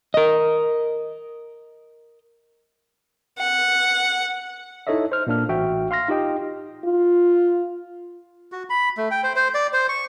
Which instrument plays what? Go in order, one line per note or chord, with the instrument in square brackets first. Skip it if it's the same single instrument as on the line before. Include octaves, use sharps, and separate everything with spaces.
[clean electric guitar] A#4 D#5
[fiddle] F#5
[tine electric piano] D#4 E4 A4 C#5 D#5 E5
C5 F6
A#2 A#3 D4 F6
A1 F#4 E5 G5
F5 C6 F6 A#6
D#4 F4 G4 D#5 G5
[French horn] F4
[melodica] F#4
B5
A3
G5
C5
C5
D5
C5
C#6